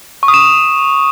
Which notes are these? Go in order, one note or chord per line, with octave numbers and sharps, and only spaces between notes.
C#6
D#6
E7